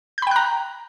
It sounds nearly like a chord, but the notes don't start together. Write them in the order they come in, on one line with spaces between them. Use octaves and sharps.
G6 B5 G5 F#6 A#5